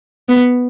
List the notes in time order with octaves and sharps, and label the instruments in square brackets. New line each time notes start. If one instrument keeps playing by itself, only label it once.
[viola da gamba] B3